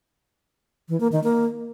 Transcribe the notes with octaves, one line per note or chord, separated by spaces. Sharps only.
E3
A#3
D#3
A#3